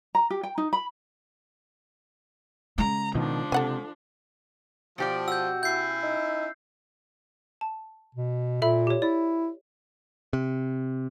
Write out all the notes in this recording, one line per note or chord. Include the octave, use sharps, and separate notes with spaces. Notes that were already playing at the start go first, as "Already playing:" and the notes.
A#5
G4
G5
D#4
B5
C#3 G#3 A#5
B2 D#3 F3 D4
C3 A4 F#5 G#5
B2 F3 G4 D5
F#4 E6 G6
C#4 E4 G6 C7
D#4
A5
B2
A#2 A4 E5 B5
G4 C#5
E4 D5
C3